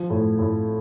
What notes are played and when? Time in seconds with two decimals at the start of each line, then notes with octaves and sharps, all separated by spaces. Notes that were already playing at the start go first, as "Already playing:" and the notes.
Already playing: F3
0.10 A2
0.39 A2